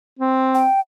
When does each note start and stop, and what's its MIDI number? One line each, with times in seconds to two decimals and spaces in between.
0.19 0.66 60
0.55 0.80 79